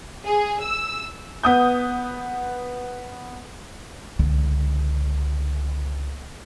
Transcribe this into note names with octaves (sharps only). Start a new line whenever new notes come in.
G#4
E6
B3 D#6 G6
C#2 D3